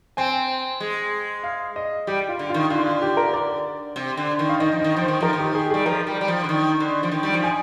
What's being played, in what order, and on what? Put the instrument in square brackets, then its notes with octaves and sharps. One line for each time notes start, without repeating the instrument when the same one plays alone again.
[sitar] C4 [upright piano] G#5
[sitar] G#3
[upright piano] F5
D#5
[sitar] G3 [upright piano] G4
[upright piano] F4
[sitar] D3
[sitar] D#3 [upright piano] F4
[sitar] D3 [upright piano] F4
[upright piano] F4
G4
A#4
D5
[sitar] C3
D3
D#3
[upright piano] F5
[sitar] D#3 [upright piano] D#5
[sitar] F3
[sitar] D#3 [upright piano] D#5
[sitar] F3 [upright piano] C5
[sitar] D#3
[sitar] F3 [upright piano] A#4
[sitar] D#3
[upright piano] G4
G#4
G4
[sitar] G3 [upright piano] G#4
[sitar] F3 [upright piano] A#4
[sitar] G3
G3
F3
D3
D#3
D3
F3
D#3
G3
F3
[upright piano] G#5